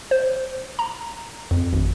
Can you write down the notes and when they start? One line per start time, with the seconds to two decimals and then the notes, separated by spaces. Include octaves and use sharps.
0.11 C5
0.79 A#5
1.51 F2
1.73 G#1